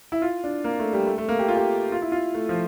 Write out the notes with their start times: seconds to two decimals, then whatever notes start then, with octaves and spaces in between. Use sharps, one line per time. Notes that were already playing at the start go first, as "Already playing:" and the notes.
0.12 E4
0.22 F4
0.44 D4
0.64 A#3
0.79 A3
0.93 G3
1.07 A3
1.18 A3
1.29 A#3
1.39 G4
1.48 F4
1.56 G4
1.92 F4
2.02 E4
2.12 F4
2.34 A3
2.49 F3